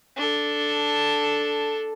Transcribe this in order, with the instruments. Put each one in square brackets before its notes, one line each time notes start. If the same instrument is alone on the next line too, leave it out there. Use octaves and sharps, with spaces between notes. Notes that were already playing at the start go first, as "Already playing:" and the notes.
[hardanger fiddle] D4 A4